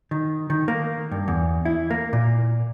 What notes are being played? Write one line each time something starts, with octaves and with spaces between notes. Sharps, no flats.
D#3
D#3
A#3
G2
E2
E4
A#3
A#2